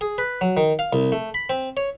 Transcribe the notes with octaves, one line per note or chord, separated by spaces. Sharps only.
G#4
B4
F#3
D#3
F5
C2
A3
B5
C4
C#5